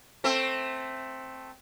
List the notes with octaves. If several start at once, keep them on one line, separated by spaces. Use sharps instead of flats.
A3 C4